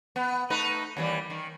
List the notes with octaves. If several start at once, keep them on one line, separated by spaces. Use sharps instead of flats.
B3
A3 D#4 B4
D#2 E3 G3
D#3